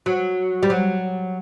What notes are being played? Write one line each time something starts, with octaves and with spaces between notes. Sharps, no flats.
F#3
G3
F#3